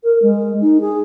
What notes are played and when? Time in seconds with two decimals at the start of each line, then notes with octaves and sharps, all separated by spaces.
0.04 A#4
0.22 G#3
0.61 D#4
0.80 G#4